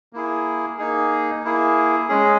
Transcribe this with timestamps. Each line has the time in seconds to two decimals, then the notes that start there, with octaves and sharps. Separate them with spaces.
0.13 A#3 E4 G#4
0.78 A#3 D#4 G#4
1.44 A#3 E4 G#4
2.08 G#3 C#4 G#4